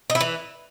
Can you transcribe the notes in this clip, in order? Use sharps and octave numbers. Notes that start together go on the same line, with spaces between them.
D#4
E4
E3